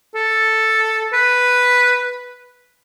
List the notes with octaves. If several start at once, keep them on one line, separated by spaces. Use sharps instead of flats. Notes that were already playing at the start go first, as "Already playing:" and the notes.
A4
B4